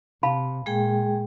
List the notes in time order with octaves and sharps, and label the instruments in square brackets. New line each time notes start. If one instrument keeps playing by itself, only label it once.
[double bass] C3 [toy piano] F5 A5 B5
[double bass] A#2 [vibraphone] G#3 G#4 G5